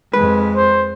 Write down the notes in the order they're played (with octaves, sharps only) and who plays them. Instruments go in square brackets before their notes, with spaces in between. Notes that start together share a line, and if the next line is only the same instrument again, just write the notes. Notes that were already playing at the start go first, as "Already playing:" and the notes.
[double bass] F2 G#3 [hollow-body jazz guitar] B4
[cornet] C5